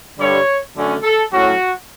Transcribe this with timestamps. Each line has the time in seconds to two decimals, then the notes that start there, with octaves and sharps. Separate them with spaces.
0.18 G2 D3 G3 C#5
0.75 F#2 D3 A3 C#4
1.03 A4
1.32 A2 F#3 C#4 F#4